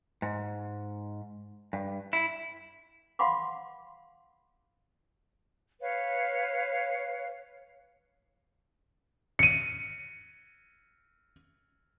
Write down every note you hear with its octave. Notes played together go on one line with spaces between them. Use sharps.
G#2
G2
E4
F5 F#5 B5 C6 D6
B4 C#5 F5
C#7 D#7